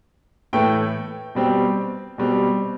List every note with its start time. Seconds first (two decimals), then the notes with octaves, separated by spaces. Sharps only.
0.53 A2 E3 A3 G5
1.35 B2 G3 C4
2.18 B2 G3 C4